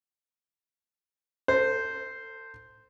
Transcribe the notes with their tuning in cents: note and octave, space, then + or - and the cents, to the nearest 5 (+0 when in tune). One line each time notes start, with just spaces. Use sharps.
A4 +35 C5 -5